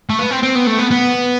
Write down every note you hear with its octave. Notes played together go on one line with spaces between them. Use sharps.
A3
B3
C4
C4
B3
A3
B3
B3